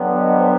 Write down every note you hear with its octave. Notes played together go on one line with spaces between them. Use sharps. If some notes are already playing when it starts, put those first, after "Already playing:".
Already playing: G2 D3 F#3 B3
D#5
C5